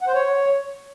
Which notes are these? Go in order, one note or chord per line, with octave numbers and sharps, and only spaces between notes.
F#5
C5
C#5